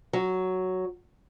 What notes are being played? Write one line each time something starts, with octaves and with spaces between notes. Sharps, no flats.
F#3